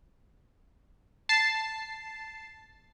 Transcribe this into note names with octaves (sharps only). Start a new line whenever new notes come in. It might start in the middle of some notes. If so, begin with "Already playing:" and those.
A5 C7